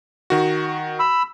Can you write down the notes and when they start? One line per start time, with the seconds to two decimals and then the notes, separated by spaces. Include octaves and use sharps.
0.30 D#3 F#4
0.99 B5 E6